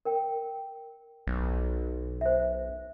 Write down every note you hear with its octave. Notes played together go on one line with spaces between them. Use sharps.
A#4 G5
B1
C5 E5